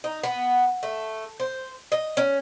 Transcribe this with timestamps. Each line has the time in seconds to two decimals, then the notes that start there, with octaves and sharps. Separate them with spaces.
0.04 D#4
0.23 B3
0.83 A3
1.40 C5
1.92 D#5
2.17 C#4